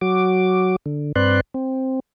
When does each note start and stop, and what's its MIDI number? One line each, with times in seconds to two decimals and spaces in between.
0.01 0.76 54
0.01 0.76 66
0.01 0.76 86
0.86 1.12 50
1.16 1.40 43
1.16 1.40 60
1.16 1.40 71
1.16 1.40 74
1.16 1.40 84
1.16 1.40 90
1.54 2.00 60